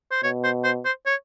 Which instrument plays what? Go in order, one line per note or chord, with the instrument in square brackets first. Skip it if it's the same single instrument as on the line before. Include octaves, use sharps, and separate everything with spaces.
[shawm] C5
[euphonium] B2 [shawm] C#5
[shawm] C5
C5
C5
C#5